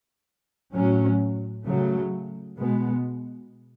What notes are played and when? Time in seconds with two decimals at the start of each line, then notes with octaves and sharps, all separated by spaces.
0.74 A2 F#3 C#4
1.66 C#3 F#3 A3
2.59 B2 G#3 B3